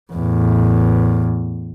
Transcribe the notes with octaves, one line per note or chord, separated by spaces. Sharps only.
E2 A2